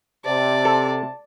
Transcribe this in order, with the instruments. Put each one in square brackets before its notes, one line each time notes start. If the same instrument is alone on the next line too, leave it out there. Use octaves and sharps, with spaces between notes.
[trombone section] C3 [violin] D5 [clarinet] A5
[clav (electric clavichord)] A4